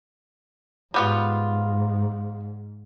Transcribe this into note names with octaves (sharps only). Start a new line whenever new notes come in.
G#2 G3 B3 F4